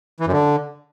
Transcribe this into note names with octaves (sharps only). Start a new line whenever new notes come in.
E3
F#2
D3